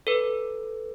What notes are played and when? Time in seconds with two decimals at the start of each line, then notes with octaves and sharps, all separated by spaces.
0.07 A4 B4